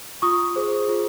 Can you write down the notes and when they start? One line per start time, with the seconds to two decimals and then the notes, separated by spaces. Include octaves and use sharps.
0.22 F4 C#6 D#6
0.56 G#4 C5
0.89 F4